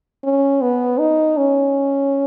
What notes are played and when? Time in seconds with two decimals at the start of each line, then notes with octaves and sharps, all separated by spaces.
0.24 C#4
0.61 B3
0.99 D#4
1.37 C#4